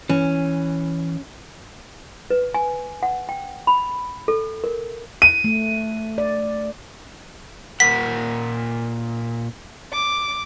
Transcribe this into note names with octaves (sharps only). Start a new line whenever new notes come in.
E3 C#4
B4
G#5
F#5
G5
B5
A4
A#4
D#7
A3
D5
A#2 A#4 F#5 B6
D6